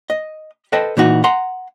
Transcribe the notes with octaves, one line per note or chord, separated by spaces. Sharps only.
D#5
A4 B4 C5 D#5 G5 A5
A#2 E3 D#4 F#4
F#5 A#5 C6